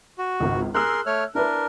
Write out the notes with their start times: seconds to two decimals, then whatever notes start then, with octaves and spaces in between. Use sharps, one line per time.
0.18 F#4
0.40 G#1 C#2
0.75 G#4 A#4 C6 E6 F#6
1.06 A3 C#5 F6
1.35 D4 E4 A#4 B4